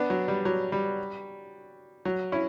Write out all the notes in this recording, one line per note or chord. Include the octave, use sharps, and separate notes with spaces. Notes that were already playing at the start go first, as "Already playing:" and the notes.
Already playing: B3 D4
F#3
G3
F#3
G3
F#3
C#4 E4